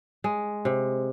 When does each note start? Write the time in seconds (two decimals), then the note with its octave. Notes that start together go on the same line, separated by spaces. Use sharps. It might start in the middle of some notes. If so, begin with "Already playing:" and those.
0.24 G#3
0.65 C3